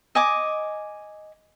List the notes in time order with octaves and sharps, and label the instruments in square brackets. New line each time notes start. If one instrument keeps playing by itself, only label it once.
[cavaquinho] D#5 G#5 D6